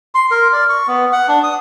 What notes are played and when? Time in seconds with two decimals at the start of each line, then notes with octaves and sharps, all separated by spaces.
0.15 C6
0.31 A#4
0.53 D5
0.69 C#6
0.88 B3
1.12 F#5
1.28 D4
1.43 D#6